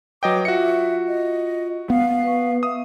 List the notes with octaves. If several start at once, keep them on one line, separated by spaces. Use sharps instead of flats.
F#3 B4 D#5 G5 D6
F4 F#4 E5 C#7
D#5
B3 F5
B4 C#6
E5 F5 D#6